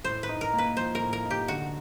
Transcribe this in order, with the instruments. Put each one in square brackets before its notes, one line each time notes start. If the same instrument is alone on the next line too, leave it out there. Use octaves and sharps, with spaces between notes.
[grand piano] A2 [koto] C5
[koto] B4
[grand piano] D#4
[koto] A#4
[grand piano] A#3
[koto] B4
[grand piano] F3 [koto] C5
[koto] A#4
[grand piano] A2
[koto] A#4
[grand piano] D#4
[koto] G4
[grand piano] D3 [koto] F#4